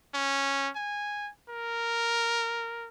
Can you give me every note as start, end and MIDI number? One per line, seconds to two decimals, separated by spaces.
0.14 0.69 61
0.76 1.30 80
1.49 2.88 70